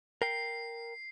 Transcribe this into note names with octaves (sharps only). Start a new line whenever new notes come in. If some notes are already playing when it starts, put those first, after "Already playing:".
A#4 G5 C7